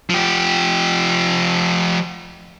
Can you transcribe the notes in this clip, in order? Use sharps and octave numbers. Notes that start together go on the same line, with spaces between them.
F3 G4